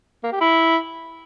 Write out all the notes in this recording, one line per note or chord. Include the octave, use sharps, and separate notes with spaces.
A#3
G4
E4